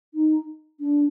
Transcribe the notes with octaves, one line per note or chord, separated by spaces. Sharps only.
D#4
D4